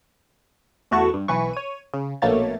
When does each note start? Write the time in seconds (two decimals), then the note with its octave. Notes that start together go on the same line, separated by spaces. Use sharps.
0.91 E2 A3 E4 F#4 A5 C#6
1.14 G2
1.28 B1 E3 B4 C#6
1.53 C#5 D#7
1.94 C#3
2.22 A#1 B2 A3 A#3 C#5 A6